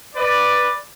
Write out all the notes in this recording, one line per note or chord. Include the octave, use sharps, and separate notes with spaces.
B4 D5